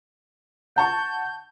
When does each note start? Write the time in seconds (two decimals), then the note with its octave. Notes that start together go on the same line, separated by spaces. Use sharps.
0.76 F#5 A5 C#6 G6